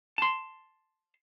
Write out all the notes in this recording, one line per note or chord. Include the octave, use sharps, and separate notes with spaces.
A5 C6